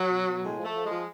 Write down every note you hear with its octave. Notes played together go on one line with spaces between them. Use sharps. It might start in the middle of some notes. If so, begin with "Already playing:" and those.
Already playing: F#3
B2
B2
A2 G#3
F3 A3
F3
G#3
F3